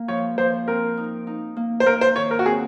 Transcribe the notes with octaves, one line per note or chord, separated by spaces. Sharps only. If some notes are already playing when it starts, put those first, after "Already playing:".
Already playing: A#3
F3 C#5
F3 C5
C4 A#4
D#4
D#4
A#3
C5
A#3 A#4
C5
D#3 C#5
A#4
F#4
C4 G#4